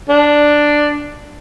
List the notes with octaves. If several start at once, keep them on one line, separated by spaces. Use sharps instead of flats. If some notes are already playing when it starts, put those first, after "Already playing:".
D4